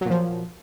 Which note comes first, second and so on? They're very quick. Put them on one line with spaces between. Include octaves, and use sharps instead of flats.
F#3 A#2 F3